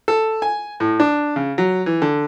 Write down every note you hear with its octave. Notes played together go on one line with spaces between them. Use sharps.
A4
G#5
A2
D4
C#3
F#3
E3
D3